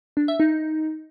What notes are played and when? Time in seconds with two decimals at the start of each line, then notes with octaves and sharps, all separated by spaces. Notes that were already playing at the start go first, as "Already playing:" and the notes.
0.17 D4
0.28 E5
0.40 D#4